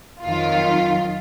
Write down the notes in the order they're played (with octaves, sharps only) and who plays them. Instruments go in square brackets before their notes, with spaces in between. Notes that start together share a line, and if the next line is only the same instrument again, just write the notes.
[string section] F2 D#3 F#3 F4